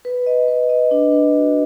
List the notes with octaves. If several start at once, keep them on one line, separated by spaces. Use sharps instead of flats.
B4
D#5
B4
D#5
D4
B4
F#4